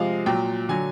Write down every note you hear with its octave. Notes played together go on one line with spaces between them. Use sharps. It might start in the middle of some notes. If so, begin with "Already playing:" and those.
Already playing: C3 F3 G#3 F5
A#2 F#3 G5
D3 F#3 G#5